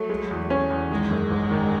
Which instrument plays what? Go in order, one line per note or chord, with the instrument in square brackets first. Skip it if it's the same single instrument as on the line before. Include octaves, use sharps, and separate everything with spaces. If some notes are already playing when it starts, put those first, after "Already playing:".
Already playing: [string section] F#3 [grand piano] A3
[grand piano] G#3
E2
C#4
E2
[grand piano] D#3 [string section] G#3
[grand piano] F#2
G#1
D#3